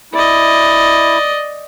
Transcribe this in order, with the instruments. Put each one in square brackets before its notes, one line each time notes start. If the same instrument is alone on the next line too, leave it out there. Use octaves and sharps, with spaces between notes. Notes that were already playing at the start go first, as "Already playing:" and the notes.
[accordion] E4 [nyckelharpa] D5 D#5